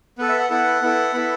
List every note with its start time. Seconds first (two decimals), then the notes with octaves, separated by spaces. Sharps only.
0.18 B3 A4 B4
0.29 E5
0.39 F#5
0.50 B3 E4 A4 F#5
0.82 B3 E4 A4
1.14 B3 E4 A4 B5